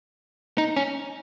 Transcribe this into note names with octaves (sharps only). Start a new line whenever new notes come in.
D#4
C#4